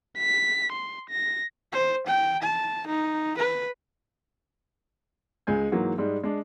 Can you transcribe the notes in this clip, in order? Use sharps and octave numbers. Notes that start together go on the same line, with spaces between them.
B6
C6
A#6
C5
G5
A5
D#4
B4
C#2 G#3 G#5 G6
G#2 E3 F#3 A#3
G#2 G3 G#3
G#3 D4